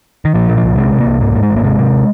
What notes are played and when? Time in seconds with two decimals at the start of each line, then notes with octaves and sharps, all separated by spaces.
0.25 D#3
0.34 A#2 F3
0.50 A#2
0.57 F3
0.63 C2
0.77 C3 G#3
0.92 C3
1.00 A#3
1.06 C2
1.20 G#2 A#3
1.35 G#2
1.43 G#3
1.50 G#1
1.57 A#3
1.64 C3 G#3
1.79 C3